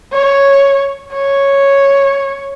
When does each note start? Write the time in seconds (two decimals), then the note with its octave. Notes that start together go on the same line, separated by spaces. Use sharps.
0.13 C#5
1.13 C#5